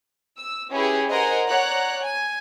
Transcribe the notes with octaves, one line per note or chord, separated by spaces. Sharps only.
E6
C#4 E4 G4 G#4 B4
A#4 C5 D#5 F#5 G#5 A#5
C#5 D5 F#5 A#5 F#6
G#5